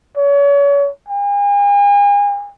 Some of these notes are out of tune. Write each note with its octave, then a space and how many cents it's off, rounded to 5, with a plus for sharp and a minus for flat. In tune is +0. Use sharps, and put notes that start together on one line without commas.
C#5 +35
G#5 -40